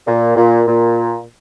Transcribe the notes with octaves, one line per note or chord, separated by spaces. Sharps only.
A#2
A#2
A#2